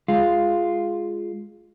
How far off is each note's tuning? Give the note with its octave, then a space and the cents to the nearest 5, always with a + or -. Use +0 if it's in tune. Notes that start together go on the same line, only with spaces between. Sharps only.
G#3 +0 F4 +0